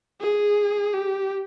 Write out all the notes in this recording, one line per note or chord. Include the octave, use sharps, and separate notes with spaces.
G#4
G4